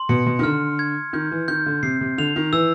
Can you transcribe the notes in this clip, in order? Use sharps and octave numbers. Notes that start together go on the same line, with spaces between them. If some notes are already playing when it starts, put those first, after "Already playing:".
Already playing: C6
B2 C#7
B2
D#3
D3 F6
G#6
D#3 G6
E3
D#3 G6
D3
C3 C7
C3
D3 F7
D#3
E3 E6